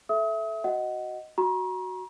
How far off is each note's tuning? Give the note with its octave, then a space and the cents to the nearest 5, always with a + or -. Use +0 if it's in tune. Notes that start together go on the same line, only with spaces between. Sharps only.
A4 -20 E5 +0 D#6 +40
F#4 +0 D#5 +0 F#5 +10
F#4 +0 A#5 +35 C#6 -45